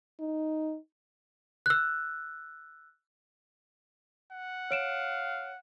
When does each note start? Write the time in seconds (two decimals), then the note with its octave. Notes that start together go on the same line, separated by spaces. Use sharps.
0.20 D#4
1.66 E6 F#6
4.32 F#5
4.71 C#5 F5 D7 E7